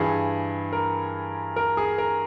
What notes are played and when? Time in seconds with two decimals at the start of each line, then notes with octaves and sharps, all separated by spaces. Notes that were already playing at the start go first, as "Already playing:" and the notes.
Already playing: G2 E3 G#4
0.73 A#4
1.56 A#4
1.77 G#4
1.98 A#4